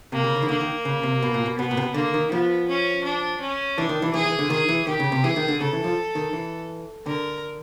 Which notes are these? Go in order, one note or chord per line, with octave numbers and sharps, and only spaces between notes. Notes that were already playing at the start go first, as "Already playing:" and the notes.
C3 A#3
C#3
C#3
D#3
D3 A#3
D#3
C#3
C3
B2
A#2
B2
B2 B3
A#2
C3
B2
D3 A#3
D#3
F3 B3
C#4
D4
C#4
E3 D4
D#3
E3
E3 G#4
E3
D3
D#3 G#4
E3
D#3 G4
C#3
C3
E3 G#4
D#3
D3
C#3 A4
E3
F3
D#3
E3
D3 A#4